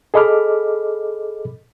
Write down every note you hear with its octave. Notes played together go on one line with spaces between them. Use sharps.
G#4 A4 D#5 B5 D6 F6